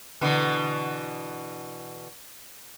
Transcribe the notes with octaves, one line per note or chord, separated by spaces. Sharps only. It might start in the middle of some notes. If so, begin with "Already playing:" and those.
B2 D3 E3